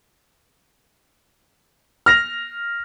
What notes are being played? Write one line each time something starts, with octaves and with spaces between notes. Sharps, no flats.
F6 A#6 F7